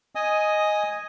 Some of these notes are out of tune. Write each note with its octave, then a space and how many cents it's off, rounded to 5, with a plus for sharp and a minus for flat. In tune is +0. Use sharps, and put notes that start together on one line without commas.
D#5 +0 G#5 +0 D#6 +10